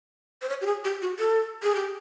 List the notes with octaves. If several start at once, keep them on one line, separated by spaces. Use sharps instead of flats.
C5
C#5
G4
G#4
G4
F#4
A4
G#4
G4